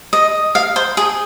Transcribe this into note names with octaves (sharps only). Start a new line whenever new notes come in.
D#5
F5
C5
G#4